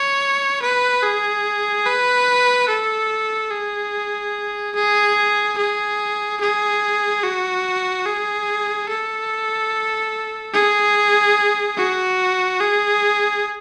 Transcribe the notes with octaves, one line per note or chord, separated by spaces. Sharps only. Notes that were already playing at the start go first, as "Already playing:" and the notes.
Already playing: C#5
B4
G#4
B4
A4
G#4
G#4
G#4
G#4
F#4
G#4
A4
G#4
F#4
G#4